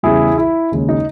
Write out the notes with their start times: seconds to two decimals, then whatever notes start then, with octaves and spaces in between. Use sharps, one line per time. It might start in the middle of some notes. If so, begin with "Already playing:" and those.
0.03 E2 C#3 E3 G3 E4 G#4
0.38 E4
0.72 D#2 C#3 G#3
0.89 D#4